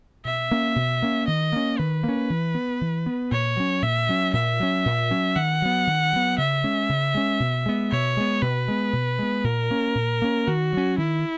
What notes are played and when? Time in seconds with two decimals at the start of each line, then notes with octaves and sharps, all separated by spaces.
0.25 B2 E5
0.51 A#3 C#4
0.76 B2
1.02 A#3 C#4
1.28 D#3 D#5
1.52 A#3 C#4
1.78 D#3 B4
2.03 A#3 C#4
2.30 E3
2.55 B3
2.81 E3
3.06 B3
3.31 A#2 C#5
3.57 F#3 C#4
3.82 A#2 E5
4.09 F#3 C#4
4.33 A#2 E5
4.60 F#3 C#4
4.86 A#2
5.11 F#3 C#4
5.36 D#3 F#5
5.62 F#3 B3
5.87 D#3
6.13 F#3 B3
6.38 C#3 E5
6.64 G#3 C#4
6.89 C#3
7.15 G#3 C#4
7.40 B2
7.66 G#3 B3
7.91 B2 C#5
8.17 G#3 B3
8.42 B2 B4
8.68 G#3 B3
8.93 B2
9.19 G#3 B3
9.44 A#2 A#4
9.71 A#3 C#4
9.95 A#2
10.22 A#3 C#4
10.47 D#3 F#4
10.73 F#3 C#4
10.98 D#3 E4